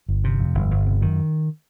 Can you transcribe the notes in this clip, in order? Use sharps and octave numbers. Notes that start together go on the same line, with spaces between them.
G1
C3
F2
G1
G1
C3
F#2 D#3